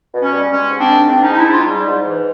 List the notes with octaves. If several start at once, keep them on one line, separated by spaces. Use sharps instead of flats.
B2
C#4
G3
G#3 C#4
G#2
C4 D4
D#3
G#2 C4 D4
G#3 C#4 D#4
D#4
D4 E4
G#2 D#4 E4 F4
G3
G#2
E3